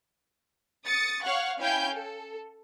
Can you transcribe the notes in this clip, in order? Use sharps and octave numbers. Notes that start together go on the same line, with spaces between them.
D#6 A6 C#7
C#5 F5 F#5 C#6
C#4 E4 F5 G5 G#5 G6
A4